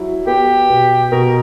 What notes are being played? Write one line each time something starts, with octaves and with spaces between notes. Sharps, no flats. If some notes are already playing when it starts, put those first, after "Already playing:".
Already playing: F#3 E4
B3 G4
B2
B2 A#4